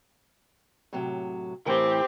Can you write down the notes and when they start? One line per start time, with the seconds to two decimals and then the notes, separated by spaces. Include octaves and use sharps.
0.93 A2 C3 F#3
1.66 A2 E3 C4 G4 A#4